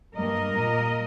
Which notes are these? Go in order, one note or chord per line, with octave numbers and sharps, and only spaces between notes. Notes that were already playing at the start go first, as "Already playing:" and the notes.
G2 G3 A#3 A#4 D#5
A#2 G3 A#3